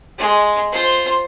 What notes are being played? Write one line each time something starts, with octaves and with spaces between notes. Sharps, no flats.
G#3
F4 C5